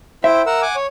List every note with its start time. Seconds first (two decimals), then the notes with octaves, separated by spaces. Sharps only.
0.24 E4 C5 E5 G5
0.46 A#4 F#5 E6
0.62 F#5 G#5 D6
0.76 C#5